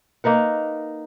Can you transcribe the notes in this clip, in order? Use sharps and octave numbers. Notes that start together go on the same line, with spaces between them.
A#3 D#4 B4 F#5